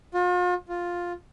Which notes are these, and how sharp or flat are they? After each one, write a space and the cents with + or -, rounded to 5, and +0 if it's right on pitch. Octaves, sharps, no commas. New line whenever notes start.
F4 +40
F4 +5